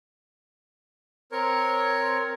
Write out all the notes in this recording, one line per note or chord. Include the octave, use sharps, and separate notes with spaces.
C4 A#4 C#5